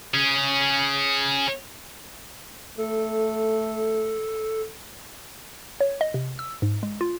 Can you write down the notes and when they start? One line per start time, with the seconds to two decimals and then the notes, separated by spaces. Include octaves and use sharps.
0.14 C#4 G#4
2.78 A3 A4
5.81 C#5
6.01 D#5
6.14 C3
6.39 E6
6.62 G#2
6.83 G#3
7.01 F4